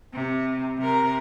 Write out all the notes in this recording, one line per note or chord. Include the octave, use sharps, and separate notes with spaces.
C3
C3 A#4